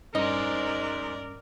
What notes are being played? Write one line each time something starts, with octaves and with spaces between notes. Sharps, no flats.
G2 C#4 D#4 A#4 C5 D5 D#5